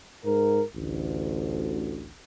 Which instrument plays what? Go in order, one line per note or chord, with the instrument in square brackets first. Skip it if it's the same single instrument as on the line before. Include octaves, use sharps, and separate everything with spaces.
[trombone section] G#2 A#4
A1 D2